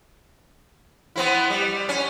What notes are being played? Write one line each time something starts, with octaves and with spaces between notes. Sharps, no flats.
B3 C4 E4
G3
C#4